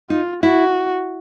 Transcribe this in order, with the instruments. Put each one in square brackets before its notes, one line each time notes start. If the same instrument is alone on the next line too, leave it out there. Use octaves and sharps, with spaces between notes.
[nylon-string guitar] D#4 [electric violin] F4
[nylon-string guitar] E4 [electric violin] F#4